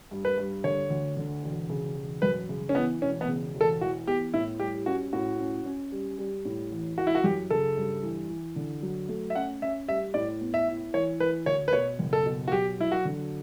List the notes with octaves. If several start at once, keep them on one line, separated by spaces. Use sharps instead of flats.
G2
B4
G2
D3 C#5
D2
D3
E1
C#3
E1
F#2 B4
C#3
C#4
E3 B3
E1 C#4
B3
C#3
E1
A4
E3 F#4
B3 G4
A2 E4
G3 G4
C#4 F#4
A2 F#4
C#4
C#4
G3
G3
A2
A1
E3 F#4
E4
F#4
F#2 G4
C#3 A4
G2
E3
E3
D3
F#3
A3
E5
C#4 F#5
C#4 E5
G3 E5
A2 D5
B3
E5
E4
E3 C#5
E3 B4
D2 C#5
B4
B2 C#5
F#1
A4
B2
F#4
F#3 G4
F#3 E4
F#4
D3